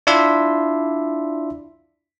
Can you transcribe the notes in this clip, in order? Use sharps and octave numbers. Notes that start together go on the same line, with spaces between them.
D4 E4 F4 D5 E5 C6